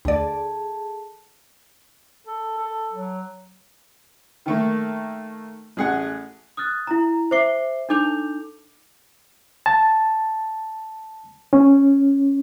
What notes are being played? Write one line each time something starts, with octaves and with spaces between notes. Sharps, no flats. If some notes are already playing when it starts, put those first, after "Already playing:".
D2 G#4 A4 D5 A5
A4
A4
F#3
D#3 A3 A#3
A1 G#4 F#5
D#6 F6 F#6 A6
E4 A#5
C5 E5 D6 C7 G7
D4 D#4 A4 D6 G6 F7
A5
C#4